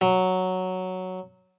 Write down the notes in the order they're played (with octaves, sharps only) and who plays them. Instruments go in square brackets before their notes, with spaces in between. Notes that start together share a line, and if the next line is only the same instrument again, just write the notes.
[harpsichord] F#3